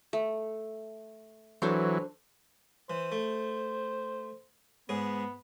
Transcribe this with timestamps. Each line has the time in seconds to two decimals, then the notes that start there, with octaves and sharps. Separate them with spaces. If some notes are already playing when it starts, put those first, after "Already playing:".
0.13 A3
1.62 E3 F#3 D4 A4 C5
2.90 E3 C5
3.12 A3
4.89 G#2 B3 G#4